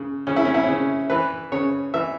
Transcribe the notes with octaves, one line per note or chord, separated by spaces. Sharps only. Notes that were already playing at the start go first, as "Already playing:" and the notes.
Already playing: C#3
C#3 C#4
E4
C#4
E4
C#4
C#3
E3 B4
C#3 C#5
E3 E5